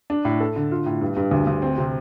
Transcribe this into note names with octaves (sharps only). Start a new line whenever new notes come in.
D4
A2
A4
D3
F4
A2
G2
G2
D2
D2
C4
C3